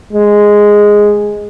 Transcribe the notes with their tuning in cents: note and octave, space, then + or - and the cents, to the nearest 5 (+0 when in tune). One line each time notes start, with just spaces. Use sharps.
G#3 -5